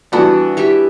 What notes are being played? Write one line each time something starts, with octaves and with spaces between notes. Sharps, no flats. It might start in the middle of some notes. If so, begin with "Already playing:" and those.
E3 G3 B3 D4 F#4
E4 G4